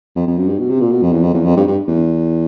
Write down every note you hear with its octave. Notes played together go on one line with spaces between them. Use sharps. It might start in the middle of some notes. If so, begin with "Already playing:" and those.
F2
F2
F#2
G2
B2
C3
A#2
B2
F2
E2
F2
E2
F2
G2
G2
E2